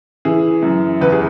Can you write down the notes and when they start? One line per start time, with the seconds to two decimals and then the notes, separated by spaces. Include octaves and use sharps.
0.25 E3 G#4
0.63 F#2
1.01 E2 B4
1.12 G#4